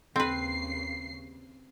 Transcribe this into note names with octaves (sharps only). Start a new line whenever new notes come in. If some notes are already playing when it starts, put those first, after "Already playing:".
D#2 C#3 C4 B4 C7